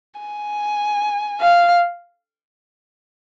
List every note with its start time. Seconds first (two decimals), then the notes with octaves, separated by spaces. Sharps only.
0.20 G#5
1.41 F5